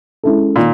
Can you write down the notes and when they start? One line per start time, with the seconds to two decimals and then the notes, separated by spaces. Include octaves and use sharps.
0.24 G#3 C#4 E4 A4
0.56 A#2 D#3